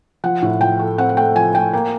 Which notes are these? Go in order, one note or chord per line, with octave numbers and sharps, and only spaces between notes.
F3 F#5
A2
F3 G5
A3
C4 F#5
F#5
A3 G5
F3 G#5
A3 G5
A#3 G5